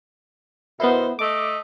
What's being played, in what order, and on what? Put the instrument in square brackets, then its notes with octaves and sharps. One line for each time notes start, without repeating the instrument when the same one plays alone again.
[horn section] B2 D#3 C5 [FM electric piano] B3 E4
[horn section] A3 D#5 [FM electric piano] D6